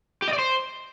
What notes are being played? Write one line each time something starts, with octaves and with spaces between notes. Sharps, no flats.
G4
D#5
D5
C5